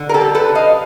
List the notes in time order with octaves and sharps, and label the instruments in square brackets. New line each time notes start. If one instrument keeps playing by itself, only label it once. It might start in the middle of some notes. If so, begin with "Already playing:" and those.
Already playing: [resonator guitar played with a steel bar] D3
A#4
G4 A4
G3
A4 B4
D3
D#5 F5